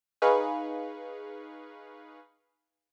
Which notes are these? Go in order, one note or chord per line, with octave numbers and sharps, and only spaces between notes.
D#4 G#4 B4 F5 C#6